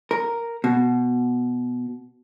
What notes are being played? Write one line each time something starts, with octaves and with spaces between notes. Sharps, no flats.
A#4
B2